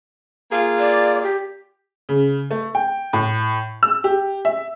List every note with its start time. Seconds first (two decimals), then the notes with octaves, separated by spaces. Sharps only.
0.51 A#3 F4 G#4
0.79 D5
1.24 G4
2.09 C#3
2.51 A3
2.75 G5
3.13 A2
3.83 E6
4.04 G4
4.45 E5